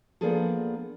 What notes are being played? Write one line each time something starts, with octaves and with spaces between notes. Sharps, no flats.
F3 A#3 B3 D4 G#4 A4